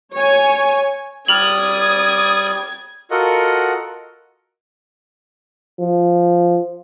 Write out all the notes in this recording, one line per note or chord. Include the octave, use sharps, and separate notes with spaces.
C#5 G#5
G3 D5 D#6 F6 G#6 F7 F#7
F4 F#4 A4 A#4 D#5 F#5
F3